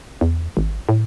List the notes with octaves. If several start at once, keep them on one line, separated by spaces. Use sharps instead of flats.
E2
G#1
A2